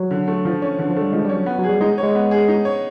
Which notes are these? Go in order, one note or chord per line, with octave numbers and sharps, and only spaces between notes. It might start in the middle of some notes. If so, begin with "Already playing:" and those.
Already playing: F#3
D3
A3
F3
C#4
D3 E3
F3
A3
G3
F3 G#3
G3
C#4
F#3
B3
F#3
G#4
G3
G#3 D#4
C#5
G#3
B3
G#4
D#4
C#5